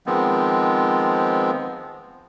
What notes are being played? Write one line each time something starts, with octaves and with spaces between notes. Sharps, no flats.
D#3 F3 G#3 B3 C4